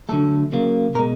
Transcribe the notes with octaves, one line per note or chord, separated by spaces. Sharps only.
D3 F#3 A3 A4
C#3 F#3 A#3
B2 G#3 A#4